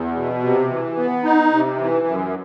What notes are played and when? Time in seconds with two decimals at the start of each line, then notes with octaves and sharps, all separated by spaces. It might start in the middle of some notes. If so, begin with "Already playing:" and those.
Already playing: E2
0.15 B2
0.42 C3
0.70 E3
0.97 B3
1.24 D#4
1.52 C3
1.79 E3
2.07 F#2